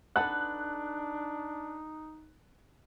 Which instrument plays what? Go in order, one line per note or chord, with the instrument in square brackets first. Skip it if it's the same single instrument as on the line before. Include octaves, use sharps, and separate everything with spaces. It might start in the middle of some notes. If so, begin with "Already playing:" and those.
[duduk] D4 [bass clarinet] D#4 [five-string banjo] A4 B4 F#5 [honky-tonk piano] F#6